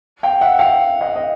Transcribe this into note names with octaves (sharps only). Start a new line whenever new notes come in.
F5 G5
E5 F#5
F5 G5
D#5 F5
D#5